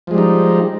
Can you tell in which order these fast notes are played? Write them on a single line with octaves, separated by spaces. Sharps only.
F3 G#3 G3 D#4